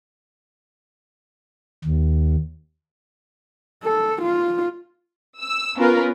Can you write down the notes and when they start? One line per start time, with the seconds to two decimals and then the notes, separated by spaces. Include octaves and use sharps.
1.85 D#2
3.83 A4
4.22 F4
5.41 E6
5.77 B3 C#4 F4 A#4 B4